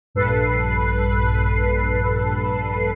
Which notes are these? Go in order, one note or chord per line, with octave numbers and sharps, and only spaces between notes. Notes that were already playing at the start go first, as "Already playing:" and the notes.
A#1 G2 A4 B4 C7